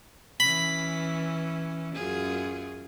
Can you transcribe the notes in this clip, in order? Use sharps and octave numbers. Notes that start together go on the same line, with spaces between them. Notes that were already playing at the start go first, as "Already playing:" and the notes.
E3 C#4 B5
F#2 F4 G#4